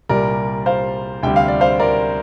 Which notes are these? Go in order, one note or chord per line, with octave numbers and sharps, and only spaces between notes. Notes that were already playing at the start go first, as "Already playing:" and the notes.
C2 A#2 G3 A#4 D5
C5 F5
D2 C3 G3 G5
F5
D5
C5 F5
A#4 D5